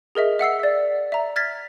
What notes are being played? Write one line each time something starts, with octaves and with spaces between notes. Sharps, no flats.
G#4 A#4 D#5 E5
E5 F#5 E6 C7
D5 E5
E5 A#5
F6 G#6 A6 B6